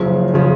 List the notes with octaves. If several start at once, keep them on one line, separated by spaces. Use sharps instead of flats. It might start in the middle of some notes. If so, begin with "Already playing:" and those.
Already playing: F#1 F#2 C#3 F3
C#3 F3